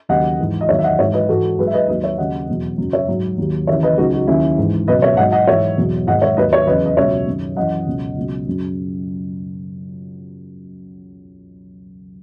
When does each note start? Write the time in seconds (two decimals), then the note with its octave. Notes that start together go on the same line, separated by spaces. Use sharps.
0.09 D#2 C#3 F#3 D#5 F#5
0.39 G#2 E3
0.61 D#5
0.68 E2 D#3 F#3 C#5 E5
0.79 E5
0.84 D#5 F#5
0.99 G#2 E3 C#5 E5
1.14 B4 D#5
1.29 G#2 E3 F#4 A4
1.58 G#2 F#3 G#4 B4
1.67 E5
1.74 B4 D#5
1.88 D#2 D#3 F#3 B4 D#5
2.04 C#5 E5
2.18 D#2 C#3 F#3 D#5 F#5
2.48 E2 B2 F#3
2.78 F#2 C#3 F#3
2.93 C#5 E5
3.08 G#2 F#3
3.38 D#2 D#3 F#3
3.67 D#2 C#3 E3 C#5 E5
3.83 B4 D#5
3.98 C#2 C#3 F#3 D#4 F#4
4.13 D#4 F#4
4.27 D#2 D#3 F#3 C#4 E4
4.58 G#2 E3
4.88 C#2 B2 F#3 B4 D#5
5.02 C#5 E5
5.17 G#2 F#3 D#5 F#5
5.32 D#5 F#5
5.47 G#2 E3 C#5 E5
5.77 E2 B2 F#3
6.07 G#2 D#3 F#3 D#5 F#5
6.22 C#5 E5
6.37 D#2 D#3 F#3 B4 D#5
6.53 C#5 E5
6.67 E2 C#3 F#3 B4 D#5
6.85 D#5
6.97 C#2 B2 F#3 C#5 E5
7.27 F#2 D#3 F#3
7.57 F#2 E3 D#5 F#5
7.87 C#2 B2 F#3
8.16 C#2 B2 F#3
8.47 F#2 C#3 F#3